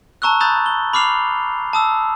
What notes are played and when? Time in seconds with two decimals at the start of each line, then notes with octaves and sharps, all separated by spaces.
0.22 A5 A#5 C#6 E6 F#6
0.40 A#5 B5 D#6 F#6 G6 A6
0.66 G7
0.93 B5 D6 F6 C7 F7
1.73 A5 D#6 E6